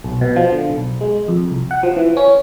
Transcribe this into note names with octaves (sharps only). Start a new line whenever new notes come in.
B1
B2
F3
D3
B1
G#3
F2
C2
F#5
F3
E3
C#4